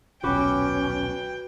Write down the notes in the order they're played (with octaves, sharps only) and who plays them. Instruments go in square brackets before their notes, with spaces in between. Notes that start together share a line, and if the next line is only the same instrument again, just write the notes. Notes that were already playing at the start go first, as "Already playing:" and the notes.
[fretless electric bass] D#1 B1 [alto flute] C#4 [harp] F#4 B4 D6 [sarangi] G5